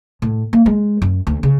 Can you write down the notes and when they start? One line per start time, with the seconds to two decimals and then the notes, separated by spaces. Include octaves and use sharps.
0.22 A2
0.53 A#3
0.66 G#3
1.02 F#2
1.27 D2
1.43 C#3